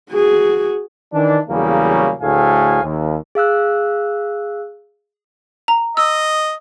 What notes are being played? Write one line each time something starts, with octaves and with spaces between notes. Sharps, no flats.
F#4 G#4
D#3 E3 D4
E2 C#3 F#3 G3 A#3
D2 A2 G#4 F5 G#5
D#2
G#4 F5 E6 F#6
A#5
D#5 E6